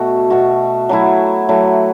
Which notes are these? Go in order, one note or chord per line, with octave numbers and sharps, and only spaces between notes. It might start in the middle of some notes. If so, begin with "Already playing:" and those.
Already playing: B2 A3 F#4 A4
B2 A3 F#4 A4
F#3 A3 E4
F#3 A3 E4